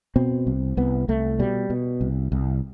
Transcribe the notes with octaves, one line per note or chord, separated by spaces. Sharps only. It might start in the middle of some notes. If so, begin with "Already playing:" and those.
B2 C4
C2
C2 B3
C2 A3
B2 G3
B2
C2
C2